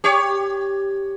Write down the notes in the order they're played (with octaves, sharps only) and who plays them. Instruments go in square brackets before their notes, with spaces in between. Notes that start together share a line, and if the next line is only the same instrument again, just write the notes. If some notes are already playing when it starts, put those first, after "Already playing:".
[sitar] G4 C#5